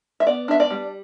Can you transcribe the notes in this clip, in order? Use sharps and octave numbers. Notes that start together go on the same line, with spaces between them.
E5
B3 D5
D4 E5
D5
G3